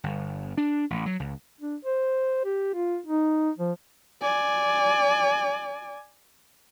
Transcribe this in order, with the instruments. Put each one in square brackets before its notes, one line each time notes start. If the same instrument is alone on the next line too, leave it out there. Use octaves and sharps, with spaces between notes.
[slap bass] G1
D4
A1
F#3
C#2
[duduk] D4
C5
G4
F4
D#4
F3
[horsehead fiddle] D5 G#5